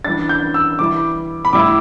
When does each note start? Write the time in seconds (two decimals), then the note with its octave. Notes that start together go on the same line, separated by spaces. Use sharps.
0.05 E3 G3 D4 A6
0.29 G6
0.54 E6
0.79 E3 G3 E4 D6
1.45 B5
1.53 A2 G3 E4 D6